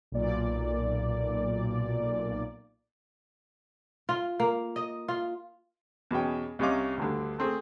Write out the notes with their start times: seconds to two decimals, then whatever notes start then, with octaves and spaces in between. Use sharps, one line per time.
0.12 B1 A#2 D5
4.09 F4
4.40 A#3
4.76 D#5
5.08 F4
6.11 E2 B2 C#4 G5
6.59 C2 C3 C#4 D#5 F5 D6
6.97 D2 G2 D3
7.38 A3 C4 G#4